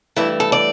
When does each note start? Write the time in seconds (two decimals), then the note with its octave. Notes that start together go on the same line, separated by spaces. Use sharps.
0.16 G2 E3 A3 E4
0.40 A4
0.52 D5